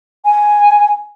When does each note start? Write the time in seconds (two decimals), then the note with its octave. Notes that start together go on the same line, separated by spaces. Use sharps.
0.24 G#5